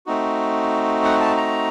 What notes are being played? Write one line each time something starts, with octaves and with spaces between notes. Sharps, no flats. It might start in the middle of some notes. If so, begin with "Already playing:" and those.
A3 C4 D#4 F#4
F#5
A5
A#5